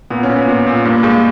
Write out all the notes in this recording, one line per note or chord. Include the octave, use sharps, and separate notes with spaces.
A#2 B3
C#4
A#2
B3
A#2
A#2
G2 A#3
A#3
G2 G#3